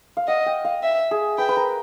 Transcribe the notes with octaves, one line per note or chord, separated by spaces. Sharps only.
F5
D#5 F#5
G5
F5
E5
G#4
B4 G5
B4
A#4